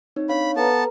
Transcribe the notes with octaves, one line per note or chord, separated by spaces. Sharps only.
C4 D#4 C#5
D4 C#5 F5 B5
B3 A4 B4 A5 A#5